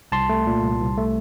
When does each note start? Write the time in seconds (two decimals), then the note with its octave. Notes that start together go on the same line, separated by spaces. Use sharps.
0.12 C2 A5 C6
0.29 A3
0.47 A#2
0.62 C2
0.80 C2
0.97 A3